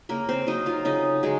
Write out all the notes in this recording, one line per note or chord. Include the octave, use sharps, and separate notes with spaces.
C#3 A#3 A#4
C4 C5
F#3 A#3 D#4 D#5
F4 F5
C#3 D#4 D#5
F#3 G#3 G#4